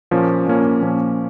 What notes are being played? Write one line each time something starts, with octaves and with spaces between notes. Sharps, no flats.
A#2 F3 A#3 C#4
A#2 F3 A#3 C#4
A#2 F3 A#3 C#4